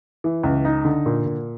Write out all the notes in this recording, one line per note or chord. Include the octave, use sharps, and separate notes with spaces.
E3
C#2
D#4
D3
A#2
A#2